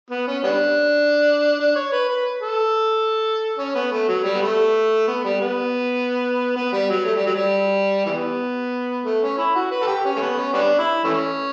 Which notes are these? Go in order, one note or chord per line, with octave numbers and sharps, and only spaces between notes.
B3
C#4
G3 B3 D4
D4
C#5
B4
B4
A4
C#4
B3
A3
F#3
G3
B3
A3
B3
G3
B3
B3
G3
F#3
A3
G3
F#3
G3
E3 G3 B3
A3
C#4
E4
F#4
B4
A4
G4
C#4
A3
B3
C#4
G3 B3 D4
E4
E3 A3 C#4